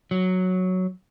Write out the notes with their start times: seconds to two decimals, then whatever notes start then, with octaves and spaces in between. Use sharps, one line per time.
0.11 F#3